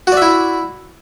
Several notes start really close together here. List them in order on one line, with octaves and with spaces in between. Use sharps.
F#4 D5 E5 E4